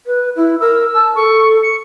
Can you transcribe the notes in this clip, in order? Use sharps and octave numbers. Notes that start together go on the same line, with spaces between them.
B4
E4
A#4 E6
A5
A4 C#6
C#7